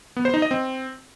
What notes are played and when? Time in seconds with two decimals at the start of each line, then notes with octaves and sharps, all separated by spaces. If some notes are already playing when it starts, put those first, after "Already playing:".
0.16 B3
0.25 C5
0.34 D#4
0.42 D#5
0.51 C4